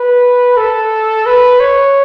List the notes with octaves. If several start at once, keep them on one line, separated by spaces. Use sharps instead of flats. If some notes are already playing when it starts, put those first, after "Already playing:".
Already playing: B4
A4
B4
C#5